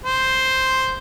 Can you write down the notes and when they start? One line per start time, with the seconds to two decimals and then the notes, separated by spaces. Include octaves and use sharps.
0.04 C5